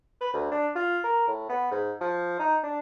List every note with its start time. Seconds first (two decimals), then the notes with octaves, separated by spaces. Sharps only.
0.21 B4
0.33 D2
0.52 D4
0.75 F4
1.04 A#4
1.27 A2
1.49 B3
1.71 G#2
2.01 F3
2.39 D#4
2.64 D4